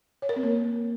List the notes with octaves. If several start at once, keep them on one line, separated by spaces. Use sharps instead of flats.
C#5
A#4
C4
A#3